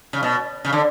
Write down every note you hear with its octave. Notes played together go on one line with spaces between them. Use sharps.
C#3
B2
C#3
D3